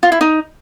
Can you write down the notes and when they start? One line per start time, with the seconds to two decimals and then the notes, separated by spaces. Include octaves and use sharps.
0.03 F4
0.12 E4
0.21 D#4